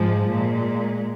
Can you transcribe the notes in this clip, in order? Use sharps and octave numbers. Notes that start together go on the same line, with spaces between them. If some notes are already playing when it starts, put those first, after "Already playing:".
Already playing: G#2 F3 G#3
A#2 G#3